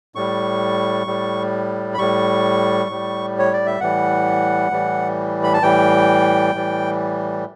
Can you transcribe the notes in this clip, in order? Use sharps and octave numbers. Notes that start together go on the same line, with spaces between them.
A2 G3 C#6
A2 G3
B5
A2 G3 C#6
A2 G3
C#5
D5
E5
A2 E3 G3 F#5
A2 E3 G3
B5
A5
A2 E3 G3 G5
A2 E3 G3